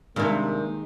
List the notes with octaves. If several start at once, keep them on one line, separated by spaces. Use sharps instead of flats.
G2 C3 D#3 G#3 A#3